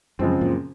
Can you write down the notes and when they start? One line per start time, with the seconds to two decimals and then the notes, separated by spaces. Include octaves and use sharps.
0.19 F#2 C#3 F3 G#3 C4
0.41 F#2 A#2